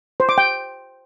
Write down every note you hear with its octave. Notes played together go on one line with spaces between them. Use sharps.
C5
D6
G5